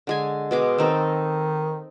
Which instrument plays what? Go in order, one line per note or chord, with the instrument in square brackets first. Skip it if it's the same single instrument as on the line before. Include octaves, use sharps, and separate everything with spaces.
[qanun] D3 G#3 G#5
B2 G#3 D6
[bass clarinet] D#3 [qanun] C4 D#4 A4